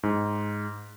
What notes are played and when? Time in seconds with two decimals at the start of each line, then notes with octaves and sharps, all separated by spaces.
0.03 G#2